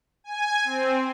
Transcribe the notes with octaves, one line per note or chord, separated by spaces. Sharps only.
G#5
C4